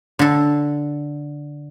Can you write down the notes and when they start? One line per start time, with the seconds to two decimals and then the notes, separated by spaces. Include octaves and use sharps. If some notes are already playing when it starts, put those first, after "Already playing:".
0.19 D3 A4